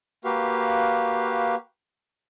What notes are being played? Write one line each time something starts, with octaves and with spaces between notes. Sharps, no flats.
A#3 F#4 G4 B4 F5